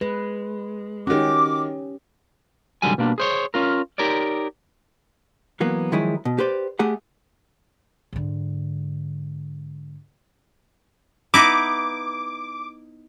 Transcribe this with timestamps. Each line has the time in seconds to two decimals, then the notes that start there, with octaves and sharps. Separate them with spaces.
0.01 G#3 B4
1.07 D#3 C#4 F#4 G4 D6
2.82 C2 G#2 D3 F#3 G3 G#5
2.98 B2 G3 A#3 D4
3.18 G#4 C5 C#5
3.54 C#4 F4 A#4
3.98 D#4 G4 A#4 C#5 D5
5.60 E3 F#3 A#3 B3
5.92 D#3 F3 F#3 G#3 E4 G#4
6.25 B2
6.39 G4 B4 C5 D5
6.79 A3 G4 G#4 F#5
8.13 G#2 D3
11.34 B3 D#4 E4 D6